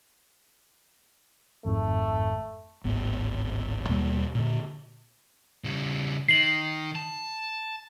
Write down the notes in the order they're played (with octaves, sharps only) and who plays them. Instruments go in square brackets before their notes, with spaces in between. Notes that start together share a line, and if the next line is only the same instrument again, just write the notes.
[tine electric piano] G#1 F2 G#2 [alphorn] A3
[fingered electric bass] D1 G#1 B3
D#2 B2 G3 A#3
A#2 D3
[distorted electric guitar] C#3 G3
[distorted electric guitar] D#3 [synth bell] C7 F#7
[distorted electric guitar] A5